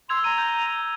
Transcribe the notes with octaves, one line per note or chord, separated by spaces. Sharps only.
C6 E6 G#6 F7
A#5 D#7
G6